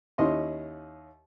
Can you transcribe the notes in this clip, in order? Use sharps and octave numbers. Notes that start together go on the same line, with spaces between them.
D#2 C#4 D#4 E4 D#5 C6